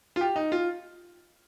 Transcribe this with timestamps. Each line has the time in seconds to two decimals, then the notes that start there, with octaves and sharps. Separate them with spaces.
0.16 F4
0.21 G4
0.36 D#4
0.52 F4